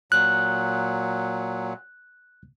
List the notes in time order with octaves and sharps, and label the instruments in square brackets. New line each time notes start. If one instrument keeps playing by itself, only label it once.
[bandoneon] A#2 F#3 [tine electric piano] F#6